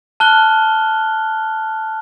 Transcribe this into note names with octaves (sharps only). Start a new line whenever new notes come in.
A5 F6 F#6 G7